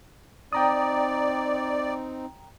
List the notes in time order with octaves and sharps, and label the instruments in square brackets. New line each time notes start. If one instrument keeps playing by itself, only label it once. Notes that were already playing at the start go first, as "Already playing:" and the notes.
[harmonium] C4 D#4 [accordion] D5 [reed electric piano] G5 A#5 D#6